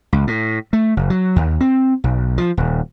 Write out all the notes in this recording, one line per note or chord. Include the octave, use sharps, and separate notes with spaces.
C#2
A2
A3
F#1
F#3
D#2
C4
B1
F3
D#1